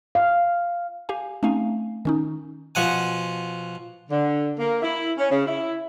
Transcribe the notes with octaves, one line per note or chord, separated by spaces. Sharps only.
F5
G4 F5 G#5
A3 C4 C#4 D#4 F5 G#5
D#3 C#4 D#4
B2 F3 F#5 G#5
D3
A#3
E4
C#4
C#3
E4